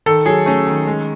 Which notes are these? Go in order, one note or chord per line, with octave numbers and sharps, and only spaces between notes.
D#3 A4
F#3 G#4
A3 C#4
D#3
G#3